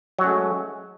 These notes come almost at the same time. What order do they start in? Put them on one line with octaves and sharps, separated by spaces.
F#3 F#4 C#4 A3 G#3